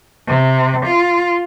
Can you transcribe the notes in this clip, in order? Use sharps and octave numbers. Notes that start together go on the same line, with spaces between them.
C3
F4